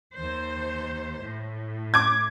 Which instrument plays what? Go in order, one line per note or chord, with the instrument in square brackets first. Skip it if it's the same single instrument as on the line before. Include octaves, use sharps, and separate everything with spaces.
[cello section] D#2 C5
A2
[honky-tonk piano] D6 G#6